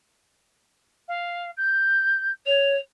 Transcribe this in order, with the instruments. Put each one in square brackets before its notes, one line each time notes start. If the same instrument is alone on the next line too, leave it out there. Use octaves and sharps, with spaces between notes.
[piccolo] F5
G6
[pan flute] C#5 [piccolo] F7